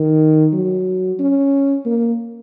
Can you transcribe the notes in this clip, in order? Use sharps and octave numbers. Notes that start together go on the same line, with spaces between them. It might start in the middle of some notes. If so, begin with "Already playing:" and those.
Already playing: D#3
F#3
C#4
A#3